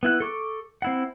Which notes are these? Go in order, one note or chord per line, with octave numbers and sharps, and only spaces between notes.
B3 E4 F#6
A4 C#6 D6
C4 E4 F#5